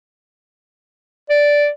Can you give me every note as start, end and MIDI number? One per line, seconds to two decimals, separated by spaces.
1.30 1.68 74